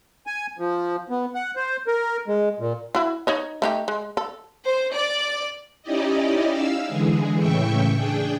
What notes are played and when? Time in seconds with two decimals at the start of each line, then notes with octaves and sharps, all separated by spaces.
0.27 G#5
0.59 F3
1.10 B3
1.35 F#5
1.56 C5
1.87 A#4
2.28 G#3
2.60 A#2
2.95 E4 F#4
3.27 D#4 C#5 D#5
3.62 A3 D#4 G4
3.88 G#3
4.17 A4
4.66 C5
4.94 D5
5.83 C#4 D#4 E4 G4 D5 D#5
6.52 F5 E6
6.86 D3 E3 G#3 G#4
7.38 A2 C#3 E3 E5 G5 C#6
7.95 D4 G#4 G5